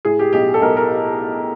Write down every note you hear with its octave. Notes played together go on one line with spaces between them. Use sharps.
A2 G#4
G4
B1 G4
A4
B1 A#4
A#4